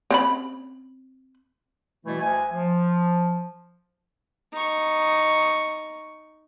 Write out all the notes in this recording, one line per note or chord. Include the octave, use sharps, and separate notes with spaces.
C4 C#4 B5
B2 E3 G3 A3 E4
D2 G#5
F3
D#4 C#6